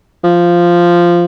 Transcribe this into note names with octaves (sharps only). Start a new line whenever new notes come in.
F3